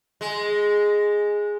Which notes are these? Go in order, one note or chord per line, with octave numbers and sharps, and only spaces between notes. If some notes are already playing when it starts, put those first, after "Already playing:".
G#3